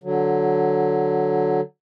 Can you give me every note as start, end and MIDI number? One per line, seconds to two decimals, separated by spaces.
0.04 1.61 50
0.04 1.61 54